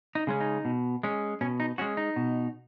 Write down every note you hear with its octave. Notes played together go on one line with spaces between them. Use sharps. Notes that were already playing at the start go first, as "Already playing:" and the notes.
D#4
C#3 G#3 C#4
D#4
B2
G#3 C#4
B2 C#4
D#4
G#3 C#4 F#4
D#4
B2